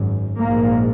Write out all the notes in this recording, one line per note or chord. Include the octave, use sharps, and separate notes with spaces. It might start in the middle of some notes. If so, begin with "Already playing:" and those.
Already playing: G#1 F#2
A#1 G#2 A#3